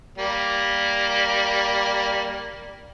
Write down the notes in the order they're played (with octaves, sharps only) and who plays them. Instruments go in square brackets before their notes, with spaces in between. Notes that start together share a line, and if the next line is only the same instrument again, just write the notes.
[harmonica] G3 A#3